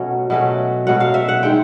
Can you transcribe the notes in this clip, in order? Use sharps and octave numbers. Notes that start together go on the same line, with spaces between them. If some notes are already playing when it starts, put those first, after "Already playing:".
Already playing: B2 F#3 A3 C#4
B2 F#3 A3 C#4
B2 F#3 A3 C#4 F#5
F5
E5
F#5
D#3 G#3 C4 G5